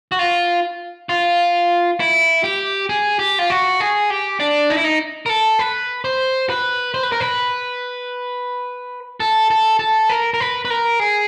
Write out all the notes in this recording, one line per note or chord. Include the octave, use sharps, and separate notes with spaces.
F#4
F4
F4
E4
G4
G#4
G4
F4
F#4
G#4
G4
D4
D#4
E4
D#4
A#4
A4
B4
C5
B4
C5
B4
A#4
B4
A4
A4
A4
A#4
A#4
B4
B4
A#4
G#4